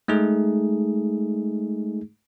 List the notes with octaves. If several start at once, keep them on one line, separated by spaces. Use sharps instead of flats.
G#3 A3 D#4 G#4